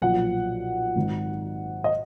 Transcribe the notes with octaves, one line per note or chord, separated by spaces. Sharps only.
B1 A#2 F3 F#5
G#1 G#2 D#3
D#5